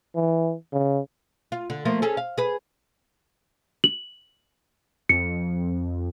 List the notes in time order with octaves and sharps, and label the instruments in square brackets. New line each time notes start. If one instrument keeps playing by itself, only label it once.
[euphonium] E3
C#3
[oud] F4
D3
F3 A3 A#3
C#4 G#4 A4
F5
G#4 B4
[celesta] F#7
[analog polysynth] F2 [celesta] C#7